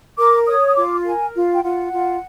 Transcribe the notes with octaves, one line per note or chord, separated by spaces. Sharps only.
A#4 D6
C#5 D#6
D#6
F4 D6
A#4 G#5
F4
G5
F4 F#5
F4